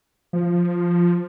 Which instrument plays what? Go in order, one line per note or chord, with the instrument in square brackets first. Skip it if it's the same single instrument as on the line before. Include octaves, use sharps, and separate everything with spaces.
[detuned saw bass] F3